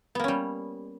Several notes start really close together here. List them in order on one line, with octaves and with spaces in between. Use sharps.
B3 A#3 C#4 G3